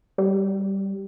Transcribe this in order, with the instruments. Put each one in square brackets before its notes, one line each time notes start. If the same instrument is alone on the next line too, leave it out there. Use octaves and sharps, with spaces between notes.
[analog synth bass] G3